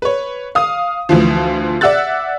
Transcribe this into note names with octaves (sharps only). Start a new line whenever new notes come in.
B4 C#5
F5 D#6
D2 E3 F3
D5 E5 F#5 E6 F#6 A6